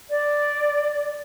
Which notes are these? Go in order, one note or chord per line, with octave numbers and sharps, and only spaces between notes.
D5